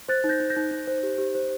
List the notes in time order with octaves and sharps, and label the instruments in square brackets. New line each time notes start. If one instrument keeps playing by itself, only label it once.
[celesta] C5 F#6 A6
D#4
G6 A#6
D#4
G6 A#6
D#4
D#4
C5
G4
G4
C5